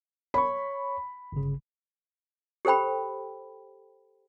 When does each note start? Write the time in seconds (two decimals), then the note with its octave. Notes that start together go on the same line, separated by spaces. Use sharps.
0.34 C#5 B5 C#6
1.32 G1 C#3
2.65 G4 A4 C5 G5 B5